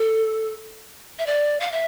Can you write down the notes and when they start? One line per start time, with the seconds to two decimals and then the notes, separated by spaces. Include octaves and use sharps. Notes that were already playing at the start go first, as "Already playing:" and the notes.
Already playing: A4
1.19 E5
1.26 D5
1.60 F5
1.72 E5